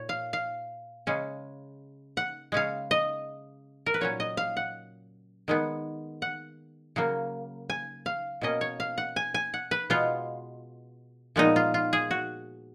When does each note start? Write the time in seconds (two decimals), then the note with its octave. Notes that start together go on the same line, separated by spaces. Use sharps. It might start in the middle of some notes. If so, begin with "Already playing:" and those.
Already playing: A#2 C#5
0.09 F5
0.33 F5
1.07 C#3 G#3 C#4
2.17 F#5
2.52 C#3 G#3 C#4 F5
2.91 D#5
3.86 A#4
3.94 B4
4.01 A#2 F#3 C#4 C#5
4.20 D#5
4.37 F5
4.57 F#5
5.48 D#3 G#3 B3
6.22 F#5
6.96 C#3 F#3 A#3
7.70 G#5
8.06 F5
8.41 B2 A#3 C#4 D#5
8.61 C#5
8.80 F5
8.98 F#5
9.16 G#5
9.34 G#5
9.54 F#5
9.71 B4
9.90 B2 G#3 B3 F4
11.36 A#2 F3 G#3 B3 D#4
11.56 F4
11.74 F4
11.93 G#4
12.11 F#4